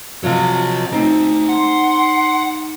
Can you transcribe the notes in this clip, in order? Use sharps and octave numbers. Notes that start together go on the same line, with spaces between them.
C3 F3 F#3 C#5 D#5
A3 C4 D#4 F#4 A#5
F#5 C6